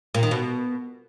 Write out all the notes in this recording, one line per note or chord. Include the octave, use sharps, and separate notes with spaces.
A#2
D#3
B2